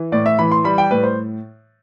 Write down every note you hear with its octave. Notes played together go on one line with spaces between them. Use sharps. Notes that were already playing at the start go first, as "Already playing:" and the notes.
Already playing: E3
A2 D5
E5
E3 B5
C6
G3 B5
G5
A2 B4
C5